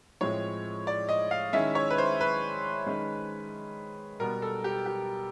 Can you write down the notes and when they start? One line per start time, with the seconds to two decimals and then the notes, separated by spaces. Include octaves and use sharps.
0.21 A2 F3 G#3 C4 C#5
0.87 D5
1.09 D#5
1.31 F5
1.53 D#3 G#3 C#4 E4 E5
1.75 C#5
1.90 B4
1.98 C5
2.21 B4
2.86 D#3 G#3 C#4
4.20 B2 G3 B3 A#4
4.42 A4
4.64 G4
4.86 G4